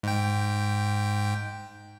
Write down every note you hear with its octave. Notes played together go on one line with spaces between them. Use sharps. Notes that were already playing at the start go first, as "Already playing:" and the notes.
G#2 G5